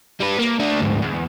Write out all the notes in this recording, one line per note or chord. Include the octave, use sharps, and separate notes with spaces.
G3 B4
A#3
A3 D4
D2 G#2
E2